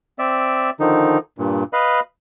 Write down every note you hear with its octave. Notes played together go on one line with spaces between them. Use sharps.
C4 D5 E5
D3 D#3 F3 D#4
G2 A#2
B4 D#5 F5 B5